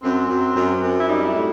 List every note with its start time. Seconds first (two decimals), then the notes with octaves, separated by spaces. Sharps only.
0.03 F#2 C4
0.30 F#2
0.56 F#2
0.82 F#2
0.99 E4
1.09 G3 D#4
1.26 E4
1.35 A2